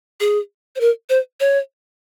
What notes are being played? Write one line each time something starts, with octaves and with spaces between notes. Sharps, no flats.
G#4
C5
A#4
C5
C#5